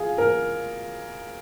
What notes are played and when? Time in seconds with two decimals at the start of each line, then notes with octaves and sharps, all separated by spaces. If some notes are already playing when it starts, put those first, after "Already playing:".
Already playing: F4 G#4
0.18 A#4